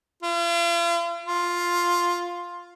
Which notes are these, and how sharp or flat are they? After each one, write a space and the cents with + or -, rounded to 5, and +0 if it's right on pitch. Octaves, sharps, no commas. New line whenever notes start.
F4 -40
F4 +5